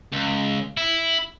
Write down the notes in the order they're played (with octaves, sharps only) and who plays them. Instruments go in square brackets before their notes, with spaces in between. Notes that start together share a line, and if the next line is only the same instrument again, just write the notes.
[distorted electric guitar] C#2
E4